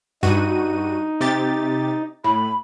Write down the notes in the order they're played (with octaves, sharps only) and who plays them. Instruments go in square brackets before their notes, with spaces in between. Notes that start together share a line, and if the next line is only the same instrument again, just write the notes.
[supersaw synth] G2 F#4 D#7 [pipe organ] D#4
[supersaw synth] C3 G4 A6
[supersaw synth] A2 [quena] B5